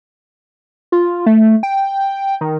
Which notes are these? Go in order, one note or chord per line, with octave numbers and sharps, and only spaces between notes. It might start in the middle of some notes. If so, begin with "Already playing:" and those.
F4
A3
G5
D#3